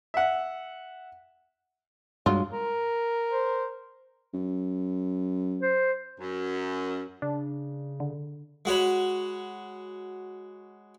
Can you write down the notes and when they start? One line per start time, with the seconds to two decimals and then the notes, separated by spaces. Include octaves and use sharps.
0.14 E5 F#5
2.26 G2 F#3 G#3 F4
2.53 A#4
3.30 C5
4.34 F#2
5.62 C5
6.18 F#2
7.22 C#3 D4
8.00 D3
8.65 G#3 F#4 C#5 B5